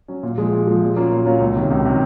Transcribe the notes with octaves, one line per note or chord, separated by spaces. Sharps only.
F#3 C#4
A#2
F3 G#3
A#2
F3 G#3
A#2
F#3 A#3 C#4 F4
A#2
F#3 A#3 C#4 F4
C#2
C3 D#3 F#3 C#4
C#2
C3 D#3 F#3 C#4